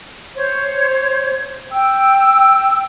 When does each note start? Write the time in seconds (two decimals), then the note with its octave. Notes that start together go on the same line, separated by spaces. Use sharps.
0.35 C5 C#5
1.71 G5 E6